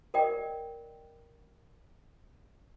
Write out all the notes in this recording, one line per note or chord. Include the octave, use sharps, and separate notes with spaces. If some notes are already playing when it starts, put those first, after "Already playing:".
A#4 D5 D#5 G5